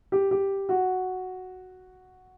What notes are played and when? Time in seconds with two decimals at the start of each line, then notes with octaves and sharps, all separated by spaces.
0.12 G4
0.31 G4
0.69 F#4